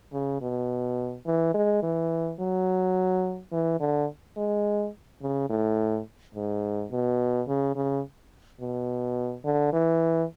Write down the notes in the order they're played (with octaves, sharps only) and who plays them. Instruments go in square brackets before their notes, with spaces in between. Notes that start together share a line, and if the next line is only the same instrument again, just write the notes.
[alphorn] C#3
B2
E3
G#3
E3
F#3
E3
D3
G#3
C#3
A2
G#2
B2
C#3
C#3
B2
D3
E3